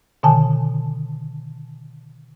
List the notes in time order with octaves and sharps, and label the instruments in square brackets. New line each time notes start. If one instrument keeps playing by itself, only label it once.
[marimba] B2 D3 D#3 G#5 A5